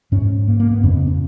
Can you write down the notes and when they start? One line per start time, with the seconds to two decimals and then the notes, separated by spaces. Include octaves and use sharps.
0.12 G#2 C#4
0.48 A#3
0.60 A#3
0.71 B3
0.83 F2 C#3 C#4
0.95 B3
1.07 C#4